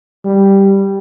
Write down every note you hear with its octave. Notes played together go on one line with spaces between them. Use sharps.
G3